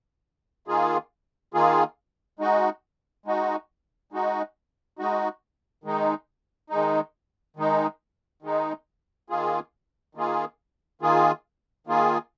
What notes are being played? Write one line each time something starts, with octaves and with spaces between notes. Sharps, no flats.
D#3 A#3 F4 G#4
D#3 A#3 F4 G#4
G#3 D#4 F#4
G#3 D#4 F#4
G#3 D#4 F#4
G#3 D#4 F#4
D#3 G#3 D#4
D#3 G#3 D#4
D#3 G#3 D#4
D#3 G#3 D#4
D#3 A#3 F4 G#4
D#3 A#3 F4 G#4
D#3 A#3 F4 G#4
D#3 A#3 F4 G#4